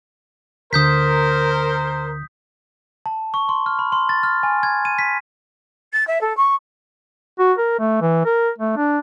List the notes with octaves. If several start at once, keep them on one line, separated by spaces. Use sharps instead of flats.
D2 D3 A#4 C5 D#6 G6 B6
A5
C#6
C6
F6
B5
C6
A6
F6
G#5
G#6
D#7
B6
A6
E5
A4
C#6
F#4
A#4
A3
E3
A#4
A3
D4